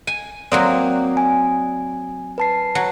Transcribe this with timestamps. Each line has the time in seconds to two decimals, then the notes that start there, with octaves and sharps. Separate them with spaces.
0.07 G#5
0.52 F#3 A#3 C4 D5 D#6
1.17 G#5
2.38 B4 A5 C7
2.75 F#3